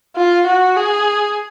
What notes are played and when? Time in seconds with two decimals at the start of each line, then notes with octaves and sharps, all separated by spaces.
0.16 F4
0.47 F#4
0.76 G#4